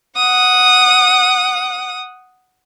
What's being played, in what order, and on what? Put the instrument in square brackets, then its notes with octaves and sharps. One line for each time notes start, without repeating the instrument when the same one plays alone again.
[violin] F#5 D#6